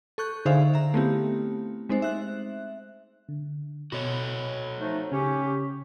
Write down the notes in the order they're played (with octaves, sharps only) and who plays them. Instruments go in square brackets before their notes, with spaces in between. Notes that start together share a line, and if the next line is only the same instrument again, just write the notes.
[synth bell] A4 C#6 F#6 G6
D3 D#4 G#4 C5 E5 F5
E5 A#5
A3 B3 C4 E4 G4
G#3 C4 D#4 C5
E5 F#6
[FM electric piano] D3
[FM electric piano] B2 B5 [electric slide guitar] F#4 A4 C#5
[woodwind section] F3 A3 D#4
[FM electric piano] C#3 [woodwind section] C#4 G4